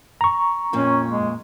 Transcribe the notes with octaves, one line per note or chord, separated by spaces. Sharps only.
A#5 C#6
F2 A#2 A#3 C#4
G#3